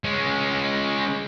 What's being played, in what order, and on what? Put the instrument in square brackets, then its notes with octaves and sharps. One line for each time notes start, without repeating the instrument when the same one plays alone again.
[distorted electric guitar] G#3 C#4